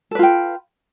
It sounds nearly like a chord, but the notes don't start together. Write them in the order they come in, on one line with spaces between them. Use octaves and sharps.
A4 B4 F4 G5